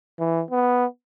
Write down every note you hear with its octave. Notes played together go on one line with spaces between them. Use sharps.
E3
B3